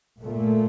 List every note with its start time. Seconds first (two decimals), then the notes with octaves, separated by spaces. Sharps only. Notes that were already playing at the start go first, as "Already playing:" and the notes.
0.21 A#2 A3